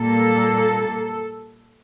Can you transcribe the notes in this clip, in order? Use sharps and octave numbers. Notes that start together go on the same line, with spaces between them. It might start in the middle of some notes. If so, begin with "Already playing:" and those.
Already playing: A#2 G3 A#3 A4